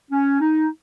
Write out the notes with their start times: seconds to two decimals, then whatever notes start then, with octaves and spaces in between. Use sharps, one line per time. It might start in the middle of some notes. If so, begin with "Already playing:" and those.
0.11 C#4
0.41 D#4